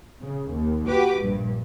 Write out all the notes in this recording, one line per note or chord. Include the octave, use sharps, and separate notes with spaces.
C#3
D#2
F#4 G4 B4 D6
A#1 G2